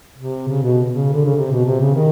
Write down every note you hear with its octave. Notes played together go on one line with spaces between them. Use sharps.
C3
C#3
B2
C#3
D3
C#3
C3
B2
C3
C#3
D#3